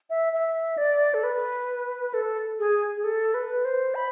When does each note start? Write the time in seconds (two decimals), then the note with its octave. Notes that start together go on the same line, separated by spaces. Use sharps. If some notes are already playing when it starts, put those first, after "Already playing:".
0.10 E5
0.33 E5
0.78 D5
1.14 A4
1.24 B4
2.14 A4
2.59 G#4
2.97 G#4
3.04 A4
3.34 B4
3.65 C5
3.95 B5